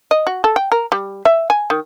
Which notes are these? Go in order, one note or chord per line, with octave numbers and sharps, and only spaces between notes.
D#5
F#4
A4
G5
A#4
G3
E5
G#5
D#3